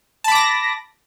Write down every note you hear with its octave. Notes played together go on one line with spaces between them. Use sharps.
A5 B5 D6 A#6